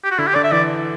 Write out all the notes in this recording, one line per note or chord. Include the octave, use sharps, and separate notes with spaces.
G4
F#4
D3 E4
G4
D3 D5
E5
E3 D5